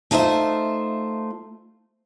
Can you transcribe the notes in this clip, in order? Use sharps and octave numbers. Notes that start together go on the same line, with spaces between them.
A3 D#4 F4 C5 E5